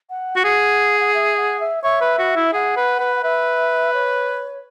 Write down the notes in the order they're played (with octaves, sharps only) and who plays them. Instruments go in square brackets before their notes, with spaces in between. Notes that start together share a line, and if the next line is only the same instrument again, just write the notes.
[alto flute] F#5
[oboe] F#4
[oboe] G#4 [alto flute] F#5
[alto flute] F#5
E5
F#5
E5
[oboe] C#5 [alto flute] E5
[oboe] B4
F#4
E4
[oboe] G#4 [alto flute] F#5
[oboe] B4
B4
[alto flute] F#5
[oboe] B4 [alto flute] E5
[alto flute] C#5